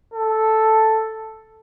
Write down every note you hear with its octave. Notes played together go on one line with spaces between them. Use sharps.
A4